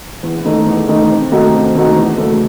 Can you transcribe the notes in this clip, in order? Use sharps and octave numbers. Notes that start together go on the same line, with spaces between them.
E2
D#3 A3 D#4
E2
D#3 A3 D#4
C3
D#3 A3 D#4 F#4
C3
D#3 A3 D#4 F#4
E2
C#3 F#3 A3